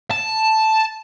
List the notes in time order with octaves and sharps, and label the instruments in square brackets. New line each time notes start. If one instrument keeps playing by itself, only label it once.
[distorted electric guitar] A5